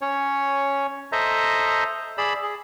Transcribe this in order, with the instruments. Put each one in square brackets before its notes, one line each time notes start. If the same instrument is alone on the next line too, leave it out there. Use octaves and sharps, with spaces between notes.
[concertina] C#4 C#5
A4 C5 D#5 E5 A#5
G#4 D5 B5 E6
G#4